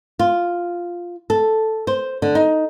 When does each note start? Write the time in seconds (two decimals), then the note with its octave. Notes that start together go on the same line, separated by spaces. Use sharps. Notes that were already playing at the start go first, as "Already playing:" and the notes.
0.19 F4
1.30 A4
1.87 C5
2.22 D3
2.35 D#4